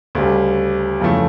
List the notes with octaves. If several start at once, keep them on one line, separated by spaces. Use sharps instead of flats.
D2 C#3 G3
F2 C#3 E3 A3